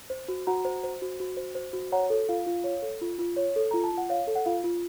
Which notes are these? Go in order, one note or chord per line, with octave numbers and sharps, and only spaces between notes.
C5
F#4
F#4 F#5 A#5
C5
C5
F#4
F#4
C5
C5
F#4
C#5 F#5 A#5
A4
F4 F5
F4
C#5
A4
F4
F4
C#5
A4
F4 A#5
A5
F4
F#5
C#5 F5
A4
F#5
F4 F5
F4